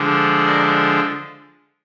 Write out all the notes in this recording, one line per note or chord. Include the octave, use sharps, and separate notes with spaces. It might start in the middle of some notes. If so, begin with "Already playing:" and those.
Already playing: D3 F3 G#3 D4
A#4 D5